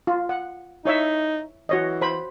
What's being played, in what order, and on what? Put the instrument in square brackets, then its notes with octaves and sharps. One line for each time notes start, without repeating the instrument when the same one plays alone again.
[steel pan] F4
F#5
[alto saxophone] D#4 [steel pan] E4 C#5 E5
[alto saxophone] E3 [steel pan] F#4 C#5 D#5
[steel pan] C5 B5